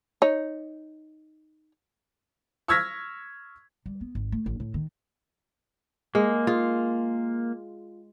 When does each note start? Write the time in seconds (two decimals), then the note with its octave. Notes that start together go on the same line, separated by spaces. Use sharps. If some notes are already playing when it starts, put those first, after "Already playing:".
0.22 D#4 C#5
2.68 C#6 E6 F6 G#6 A#6 B6
3.86 G3
4.01 B3
4.15 G#1
4.32 A3
4.46 A1
4.60 A2
4.74 D#3
6.15 G#3 A#3
6.47 F4 G#4